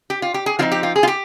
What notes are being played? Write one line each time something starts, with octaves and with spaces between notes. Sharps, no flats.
G4
F4
G4
G#4
F3 C4 D#4 F4
G4
F4
G#4
F4
G4